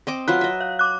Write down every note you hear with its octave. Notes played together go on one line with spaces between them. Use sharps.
C4 D#5 D6
F#3 F4 B4 F#6
D#5 E5
F5
D6 F#6